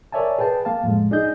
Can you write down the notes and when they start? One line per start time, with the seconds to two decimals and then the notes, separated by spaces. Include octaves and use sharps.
0.12 A#4 C#5 D5 E5 G#5 A5
0.38 G#4 B4 G5 A5
0.65 A#3 F5 A5
0.83 F2 A2 G#3
1.11 D4 D#4 G#4 D#5 G6